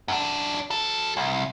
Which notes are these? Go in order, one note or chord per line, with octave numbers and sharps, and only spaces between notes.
F#2 D4
F#3 A4
C2